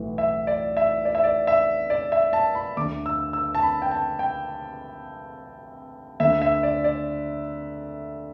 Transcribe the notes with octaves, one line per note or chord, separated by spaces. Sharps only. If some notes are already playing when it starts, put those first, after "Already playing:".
Already playing: B1 A2 E3
E5
D5
E5
D5
E5
D5
E5
D5
E5
A5
B5
D2 D3 D6
E6
E6
A5
B5
G5
A5
G5
D2 D3 E5
E5
D5
D5